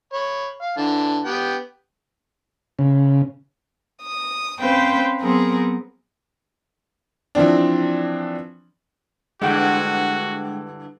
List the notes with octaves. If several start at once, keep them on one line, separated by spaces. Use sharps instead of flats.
C#5 B5
F5
D3 E3 A5
B3 G4 G5
C#3
D#6
C4 C#4 B4 C5 F5 G5
F#3 B3 C4 G#4 A#4
E3 F3 C4 D4
G2 D3 E3 G#3 F#4 F#5 G5